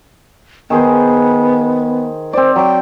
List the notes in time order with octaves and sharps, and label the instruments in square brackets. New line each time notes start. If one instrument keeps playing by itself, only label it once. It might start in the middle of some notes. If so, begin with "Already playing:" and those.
[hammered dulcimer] D#3 G#4 C5 [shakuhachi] B3
[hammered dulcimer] C4 D5 [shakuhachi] C5
[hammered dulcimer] F#3 [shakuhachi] G5